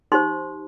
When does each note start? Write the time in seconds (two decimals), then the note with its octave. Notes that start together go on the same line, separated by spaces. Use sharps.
0.12 D#4 G4 C5 C6